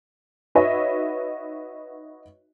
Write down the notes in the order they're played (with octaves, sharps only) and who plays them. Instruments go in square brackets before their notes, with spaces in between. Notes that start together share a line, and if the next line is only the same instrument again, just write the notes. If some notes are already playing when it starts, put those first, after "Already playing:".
[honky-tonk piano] D#4 F#4 B4 C#5 D#5 E5